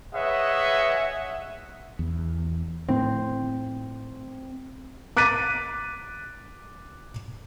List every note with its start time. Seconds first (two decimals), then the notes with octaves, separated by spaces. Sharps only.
0.14 G#4 B4 C#5 D#5 E5 F#5
1.99 E2
2.88 A2 C4
5.17 D6 F#6 A6 B6 D#7